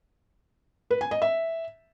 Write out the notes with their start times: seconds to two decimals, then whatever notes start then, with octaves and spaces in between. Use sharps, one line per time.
0.91 B4
1.01 G#5
1.11 D#5
1.22 E5